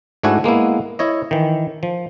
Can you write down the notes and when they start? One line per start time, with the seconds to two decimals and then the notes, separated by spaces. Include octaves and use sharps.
0.23 G#2 A3 D4 E4 F#4 G#5
0.44 G#3 A#3 B3 E4
0.99 E4 C#5 D#5
1.31 D#3 E3
1.83 F3